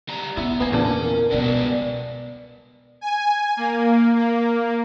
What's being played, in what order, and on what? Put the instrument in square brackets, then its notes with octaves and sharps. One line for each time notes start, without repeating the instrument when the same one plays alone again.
[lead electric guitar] G3 A#5
[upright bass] C#3 [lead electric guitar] B3 [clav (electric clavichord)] E4
[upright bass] C#3 [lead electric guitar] A#3 [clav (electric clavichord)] B3 G#5
[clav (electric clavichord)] E2 A#2 D4 [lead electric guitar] C#4
[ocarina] A#4
[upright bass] C#2 B2 [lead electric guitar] G2 B3 [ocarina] D5
[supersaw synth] G#5
A#3
A#3